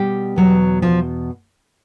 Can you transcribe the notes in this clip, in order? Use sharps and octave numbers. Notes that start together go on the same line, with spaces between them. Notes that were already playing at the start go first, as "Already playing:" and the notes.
Already playing: B2 G3 G4
E2 B2 F#3
F3 F4